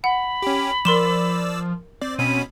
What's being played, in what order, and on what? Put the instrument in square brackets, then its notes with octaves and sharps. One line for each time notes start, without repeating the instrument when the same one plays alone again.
[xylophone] F#5 [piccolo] B5
[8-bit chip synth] C#4 G4
[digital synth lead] F3 [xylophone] A#4 C6 E7 [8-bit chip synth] D5 E6
[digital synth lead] C4 [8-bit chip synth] D5
[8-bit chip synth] B2 C#4 B5 [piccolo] D#7